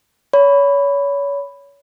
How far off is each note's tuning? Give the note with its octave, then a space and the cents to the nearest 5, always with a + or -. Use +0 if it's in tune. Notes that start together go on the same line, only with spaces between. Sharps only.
C#5 +30 B5 +5